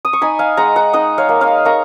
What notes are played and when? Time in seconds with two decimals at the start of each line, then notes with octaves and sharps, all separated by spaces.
0.05 D#6
0.13 C#6
0.21 D#4 G#5 B5
0.39 F5 G#5
0.57 G#3 F#5 A#5
0.76 F#5 A#5
0.93 D#4 D#5 F#5
1.18 C#5 F5
1.29 A#3
1.41 C#5 F5
1.65 A#3 A#5 C#6